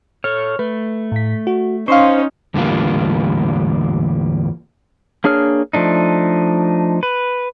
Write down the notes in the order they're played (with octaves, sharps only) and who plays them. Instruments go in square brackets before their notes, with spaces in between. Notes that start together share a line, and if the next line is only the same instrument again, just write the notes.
[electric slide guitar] A4 C#5 [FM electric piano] F6
[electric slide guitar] A3 [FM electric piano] B4
[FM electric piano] A2 B6
F#4
[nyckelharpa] C#4 D#4 [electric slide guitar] C5 [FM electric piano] F5 C6 C#6
[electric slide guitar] E2 A2 D3 G3 A#3 F4
[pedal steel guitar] A#3 D4 G#4 C#5 F6
F3 A3 D4 D#4
B4